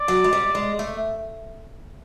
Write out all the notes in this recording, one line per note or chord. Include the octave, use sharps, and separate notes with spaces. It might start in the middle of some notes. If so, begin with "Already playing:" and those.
Already playing: D5
F#3
G#3
G3
G#3
A3